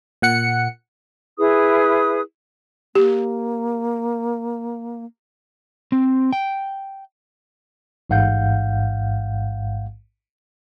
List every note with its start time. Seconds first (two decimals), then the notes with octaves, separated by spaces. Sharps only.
0.22 A#2 F#5 C#7
1.37 E4 G#4 B4 D#6
2.95 A#3 G4
5.92 C4
6.33 G5
8.10 A1 G#2 F5 F#5 G6